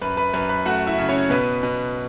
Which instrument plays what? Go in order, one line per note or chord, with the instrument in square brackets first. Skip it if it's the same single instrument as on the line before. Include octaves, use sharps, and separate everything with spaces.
[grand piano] F#2 B4 B5
B4 B5
F#2 B4 B5
B4 B5
A3 F#4 F#5
E4 E5
C#3
C#4 C#5
B2 B3 B4
B2